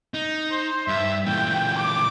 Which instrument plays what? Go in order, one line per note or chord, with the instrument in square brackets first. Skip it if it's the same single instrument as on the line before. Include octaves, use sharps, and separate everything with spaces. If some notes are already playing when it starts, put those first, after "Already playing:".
[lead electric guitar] D#4
[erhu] C5
[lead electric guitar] G2 [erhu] E5
[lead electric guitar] A#2 E3 [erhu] G5
[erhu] D6